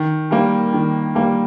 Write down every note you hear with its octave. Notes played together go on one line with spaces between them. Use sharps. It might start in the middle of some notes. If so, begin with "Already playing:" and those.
Already playing: D#3
G3 A#3
D#3
G3 A#3